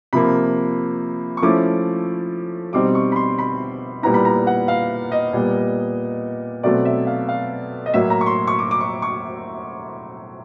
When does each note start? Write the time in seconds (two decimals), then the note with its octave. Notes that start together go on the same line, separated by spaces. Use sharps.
0.13 C3 F3 A#3 B5
1.37 C#6
1.42 F3 A3 C#4 E4 D6
2.73 B2 G3 C4 D#4 D6
2.95 C#6
3.12 B5
3.16 C6
3.39 B5
4.03 A#2 G3 B3 E4 A#5
4.14 B5
4.25 A#5
4.47 F#5
4.68 F5
5.12 D#5
5.33 A#2 G3 B3
6.63 B2 F#3 A3 C4 D5
6.85 E5
7.07 F5
7.28 F5
7.86 D#5
7.94 A2 F#3 A#3 E5
8.10 A#5
8.21 C#6
8.26 C6
8.47 C#6
8.59 D6
8.71 D6
8.81 C#6
9.02 C#6